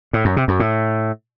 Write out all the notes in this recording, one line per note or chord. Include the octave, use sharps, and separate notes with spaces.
A2
F#2
C3
F#2
A2